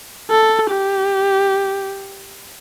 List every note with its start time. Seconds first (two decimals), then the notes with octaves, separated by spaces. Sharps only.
0.30 A4
0.71 G4